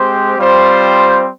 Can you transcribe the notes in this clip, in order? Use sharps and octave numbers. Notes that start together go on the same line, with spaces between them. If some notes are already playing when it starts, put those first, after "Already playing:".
Already playing: G#3 C4 G4 C5
G3 C4 F4 C5